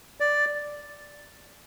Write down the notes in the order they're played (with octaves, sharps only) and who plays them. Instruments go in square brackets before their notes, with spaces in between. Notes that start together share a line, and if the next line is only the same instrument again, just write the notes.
[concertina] D5